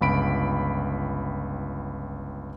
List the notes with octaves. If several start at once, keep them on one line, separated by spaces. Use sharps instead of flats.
G1 C#2 B5 D7